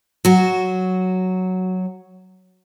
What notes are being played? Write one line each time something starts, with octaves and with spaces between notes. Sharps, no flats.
F#3 F#4